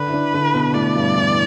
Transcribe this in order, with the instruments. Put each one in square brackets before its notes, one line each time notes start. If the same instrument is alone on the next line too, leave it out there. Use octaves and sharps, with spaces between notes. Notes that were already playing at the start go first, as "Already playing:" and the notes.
Already playing: [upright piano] D3 D4 [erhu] B4
[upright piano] E4
D3 D4
D3 D4
B2 B3
[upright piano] A2 A3 [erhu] D5
[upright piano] G2 G3
E2 E3